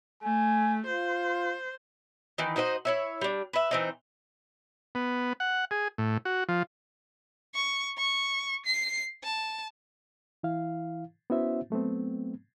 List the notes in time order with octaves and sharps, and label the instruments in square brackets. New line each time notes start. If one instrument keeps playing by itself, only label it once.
[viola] A3 [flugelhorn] G#5
[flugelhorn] F4 [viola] C5
[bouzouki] D#3 E3 D#4
D#4 F#4 C5 D#5
E4 C#5 E5
G3 D4
B4 E5
E3 C4 D#4
[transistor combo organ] B3
F#5
G#4
A2
F#4
F3
[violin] C#6
C#6
C7
A5
[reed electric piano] E3 E4 F5
B3 C#4 E4 F#4 C5 E5
F#3 A3 B3 C4